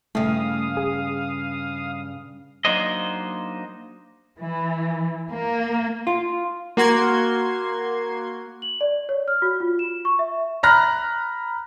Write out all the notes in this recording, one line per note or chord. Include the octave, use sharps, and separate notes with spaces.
G2 C#3 G3 A3 F5 D#6
G#4
F#3 A#3 D4 D#4 C5 D#5
E3
A#3
F4
A#3 F#4 C6 G#6
F#7
D5
C#5
F6
F#4
F4
E7
C#6
E5
A#5 B5 F6 F#6 A#6